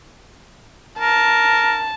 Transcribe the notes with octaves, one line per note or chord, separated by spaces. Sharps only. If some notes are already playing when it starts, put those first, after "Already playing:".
A#4 A5